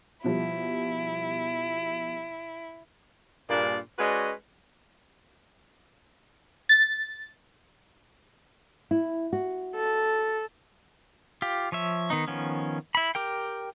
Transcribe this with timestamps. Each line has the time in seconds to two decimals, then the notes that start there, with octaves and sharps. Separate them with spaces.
0.24 B2 F3 G3 E4
3.50 G2 A#2 A#3 D4 G#4 D5
3.98 G#3 C#4 F#4 B4 D5 D#5
6.69 A6
8.91 E4
9.33 F#4
9.76 A4
11.42 F4 G4
11.72 F3 C#5 E5
12.10 D#3 B3 D#4
12.28 D#3 F3 B3 C#4
12.95 E4 B5
13.15 G4 A#4 G5